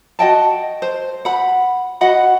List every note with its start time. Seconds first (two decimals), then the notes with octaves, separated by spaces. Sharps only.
0.19 F#4 D#5 G5 A5
0.82 C5
1.25 F#5 B5
2.01 F#4 D#5 F#5 B5